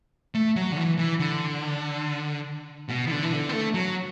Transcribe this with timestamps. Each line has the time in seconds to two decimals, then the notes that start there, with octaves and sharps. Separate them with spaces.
0.35 A3
0.56 F#3
0.72 D3
0.77 E3
0.98 E3
1.19 D3
2.89 B2
3.07 E3
3.11 D3
3.23 E3
3.32 D3
3.49 B3
3.53 A3
3.74 F#3